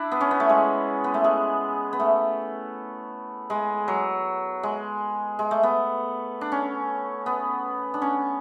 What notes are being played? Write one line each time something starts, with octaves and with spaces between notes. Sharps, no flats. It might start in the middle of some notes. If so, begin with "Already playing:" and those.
Already playing: D4 E4
B3
C#4
B3
A3
G#3
B3
A3
G#3
B3
A3
G#3
F#3
G#3
G#3
A3
B3
D4
C#4
B3
D4
C#4